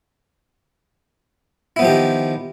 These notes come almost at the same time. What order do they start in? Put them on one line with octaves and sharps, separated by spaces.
E4 B3 F3 G4 D#3